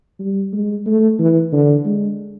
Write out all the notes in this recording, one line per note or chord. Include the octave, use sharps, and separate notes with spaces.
G3
G#3
A3
E3
D3
G#3